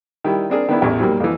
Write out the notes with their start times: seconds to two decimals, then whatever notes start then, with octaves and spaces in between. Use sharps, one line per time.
0.24 D#3 G3 E4
0.50 C4 D4 G#4 A#4
0.69 D#3 B3 D4 E4
0.81 A1 E2 G4
0.99 G#2 F#3 G3 A#3
1.20 F2 E3